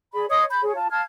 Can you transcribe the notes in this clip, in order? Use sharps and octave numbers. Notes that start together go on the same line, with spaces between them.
G#4 D5 B5
C#5 D#5 C6 D#6
B5 G6
G#4 C#5
F4 A5
F5 A5 F6 G#6